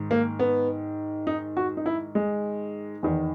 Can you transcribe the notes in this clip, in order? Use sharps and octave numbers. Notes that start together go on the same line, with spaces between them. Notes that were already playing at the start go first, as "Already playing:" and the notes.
Already playing: G#2 D#3
A#3
B3
D#4
F#4
D#4
E4
G#3
E2 D#3